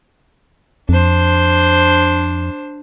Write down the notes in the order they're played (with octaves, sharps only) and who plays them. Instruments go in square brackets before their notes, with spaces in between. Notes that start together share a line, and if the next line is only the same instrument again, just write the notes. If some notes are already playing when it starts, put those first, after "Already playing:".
[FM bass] F2 [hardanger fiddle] D4 C5